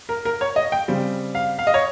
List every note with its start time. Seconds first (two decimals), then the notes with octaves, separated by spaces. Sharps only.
0.09 A#4
0.25 A#4
0.41 C#5
0.56 D#5
0.72 G5
0.88 C#3 G3 C4
1.35 F5
1.59 F5
1.67 D#5
1.74 C#5